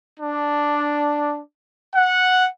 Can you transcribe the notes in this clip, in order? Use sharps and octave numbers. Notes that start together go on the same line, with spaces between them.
D4
F#5